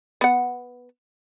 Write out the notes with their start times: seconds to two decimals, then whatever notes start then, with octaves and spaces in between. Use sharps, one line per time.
0.21 B3 F#5